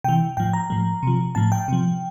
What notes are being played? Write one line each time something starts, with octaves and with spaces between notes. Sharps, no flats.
C3 E3 G5
A2 F3 G5
A#5
A2 F3
C3 F3
A2 F3 A5
G5
C3 F3